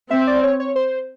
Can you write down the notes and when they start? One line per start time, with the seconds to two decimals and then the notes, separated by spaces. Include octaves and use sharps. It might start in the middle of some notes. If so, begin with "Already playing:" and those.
0.10 C4 E5
0.27 D5
0.43 C#5
0.60 C#5
0.76 C5